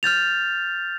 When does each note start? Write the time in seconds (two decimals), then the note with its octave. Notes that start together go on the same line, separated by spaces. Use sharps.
0.03 F6 G6 A6 F7